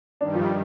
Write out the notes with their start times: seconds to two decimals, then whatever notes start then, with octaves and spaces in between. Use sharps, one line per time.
0.20 G2 D#3 G3 D4
0.35 F3